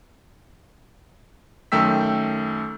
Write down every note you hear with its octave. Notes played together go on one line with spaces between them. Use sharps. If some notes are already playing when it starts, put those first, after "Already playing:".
F#2 D#3 A3 G5 E6 B6